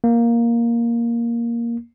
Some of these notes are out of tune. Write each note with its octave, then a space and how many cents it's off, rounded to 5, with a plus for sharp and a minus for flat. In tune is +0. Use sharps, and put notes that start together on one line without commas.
A#3 +5